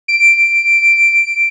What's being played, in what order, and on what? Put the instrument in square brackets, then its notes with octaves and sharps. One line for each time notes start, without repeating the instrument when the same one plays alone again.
[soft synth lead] D7